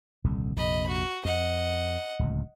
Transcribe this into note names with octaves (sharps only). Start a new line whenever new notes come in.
D#1 C2 D3
A#1 F2 C3 D#5 B5
F#4
F2 D#5 F#5
D1 C#2